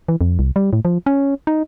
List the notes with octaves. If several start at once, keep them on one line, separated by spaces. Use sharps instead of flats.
E3
F2
C2
G3
A2
F3
C#4
D#4